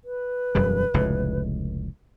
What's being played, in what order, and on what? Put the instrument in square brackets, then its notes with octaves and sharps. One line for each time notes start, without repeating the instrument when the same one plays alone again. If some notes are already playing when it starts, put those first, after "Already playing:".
[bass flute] B4
[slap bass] E1 F#2 G3
F1 C#2 A2